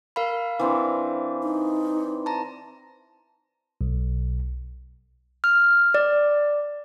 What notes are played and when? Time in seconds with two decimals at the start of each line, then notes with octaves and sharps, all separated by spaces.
0.16 A#4 F5 B5
0.59 E3 C4 D4
1.43 D#4
2.26 A5 A#5
3.81 B1
5.44 F6
5.94 D5